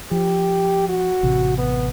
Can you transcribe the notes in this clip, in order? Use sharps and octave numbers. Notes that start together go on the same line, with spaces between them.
F3 G4
F#4
A1 C3
B3